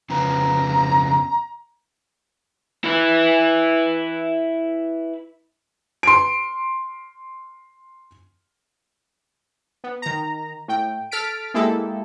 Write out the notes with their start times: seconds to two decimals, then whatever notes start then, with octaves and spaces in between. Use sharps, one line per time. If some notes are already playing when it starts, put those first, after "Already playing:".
0.10 F2 C#3 B3 A#5
2.84 E4 B4
6.03 C6 D7
9.84 B3
10.02 D#3 A#5
10.68 A2 G5
11.11 A4 F6 A6 B6 D7
11.54 G#3 A#3 E4 G4 A4